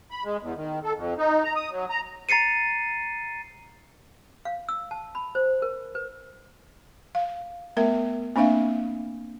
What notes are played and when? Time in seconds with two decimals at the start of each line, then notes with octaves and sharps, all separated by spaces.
0.11 B5
0.25 G#3
0.42 E2
0.57 D#3
0.84 A4
0.95 F2
1.18 D#4
1.44 A#5
1.55 D#6
1.71 F#3
1.90 A#5
2.29 A#5 A6 C7 C#7 D#7
4.45 F5
4.69 E6
4.91 A5
5.15 B5
5.35 C5
5.62 A#4
5.95 B4
7.15 F5
7.77 A3 B3 A#4 E5
8.36 A#3 C4 D4 E5 F5